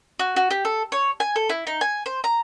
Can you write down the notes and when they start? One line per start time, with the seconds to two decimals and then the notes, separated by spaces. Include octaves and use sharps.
0.19 F#4
0.36 F#4
0.51 G4
0.65 A4
0.92 C#5
1.20 G#5
1.36 A4
1.49 E4
1.67 D#4
1.81 G#5
2.06 C5
2.24 A#5